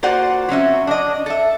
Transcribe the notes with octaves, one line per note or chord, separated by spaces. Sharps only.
A#3 F4 F#4 C5 D5 F#5
F#3 C4 C#4 E5
D4 D#5
A4 E5